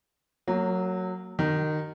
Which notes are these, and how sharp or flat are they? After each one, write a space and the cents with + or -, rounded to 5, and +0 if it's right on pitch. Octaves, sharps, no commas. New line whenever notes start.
F#3 +0 A#3 -35
D#3 -20 F#4 +40